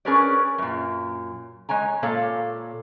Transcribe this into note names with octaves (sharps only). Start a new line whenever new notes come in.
C#4 G#4 A#4 B4 C#5 D5
F#2 A#2
G#3 C#5 G#5 A#5
A#2 A#3 A4 C#5 F5